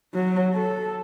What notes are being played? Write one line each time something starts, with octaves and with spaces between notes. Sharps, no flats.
F#3
A4